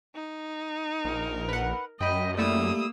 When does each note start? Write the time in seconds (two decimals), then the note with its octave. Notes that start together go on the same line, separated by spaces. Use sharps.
0.15 D#4
1.05 A#1 A#4
1.48 B4 F#5
2.00 F#2 D#5 G5 B5
2.38 G3 A3 A#3 E4 D#6 E6